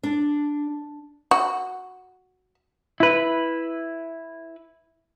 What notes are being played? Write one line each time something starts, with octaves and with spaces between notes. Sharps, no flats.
D4
F#4
E4 B4